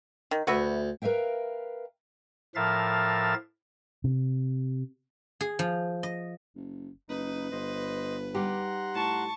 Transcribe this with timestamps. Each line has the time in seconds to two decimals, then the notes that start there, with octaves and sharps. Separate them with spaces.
0.31 D#3
0.47 D2 F#4 B4 E5
1.02 A#4 B4 E5 F5 G5
2.55 A2 F3 A#4 E5 F5 A6
4.04 C3
5.41 G#4
5.59 F3
6.03 D#5
6.55 F#1
7.09 F#1 D#4 B4
7.52 G1 C5 D#5
8.35 G3 D#4 G4 F#5 A#5 C6
8.94 A2 A5 C#6